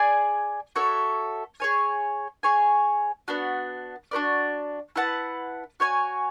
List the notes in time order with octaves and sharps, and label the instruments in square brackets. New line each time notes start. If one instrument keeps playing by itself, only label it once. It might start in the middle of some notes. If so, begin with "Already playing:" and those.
Already playing: [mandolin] G#4 D5 G#5
F#4 A4 C#5 E5
G#4 C#5 G#5
G#4 C#5 G#5
B3 D4 F#4
D4 F#4 B4 D5
E4 B4 F#5 A5
F#4 C#5 G#5